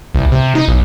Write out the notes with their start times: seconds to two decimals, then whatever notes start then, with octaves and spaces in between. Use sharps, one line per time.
0.15 C2
0.32 C3
0.55 D#4
0.68 B1